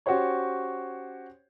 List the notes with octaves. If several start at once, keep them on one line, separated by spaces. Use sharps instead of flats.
C#4 F#4 G4 C5 C#5